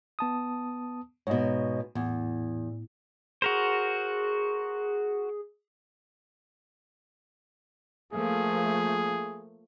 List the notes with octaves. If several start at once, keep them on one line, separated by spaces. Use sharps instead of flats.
B3 A5 D#6
G#2 B2 C#5 D#5
E2 A2
F#4 G#4 A#4 C5
F3 A3 A#3 G#4